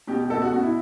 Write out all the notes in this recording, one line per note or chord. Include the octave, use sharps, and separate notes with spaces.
B2 G4
G4
B2 A4
F#4
B2 F#4
E4